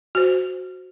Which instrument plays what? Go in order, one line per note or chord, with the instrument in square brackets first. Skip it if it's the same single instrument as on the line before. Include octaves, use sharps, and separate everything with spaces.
[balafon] F#4 C5